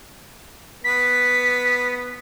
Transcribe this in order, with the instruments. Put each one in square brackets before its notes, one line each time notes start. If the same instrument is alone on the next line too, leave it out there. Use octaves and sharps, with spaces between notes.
[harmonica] B3 [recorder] B6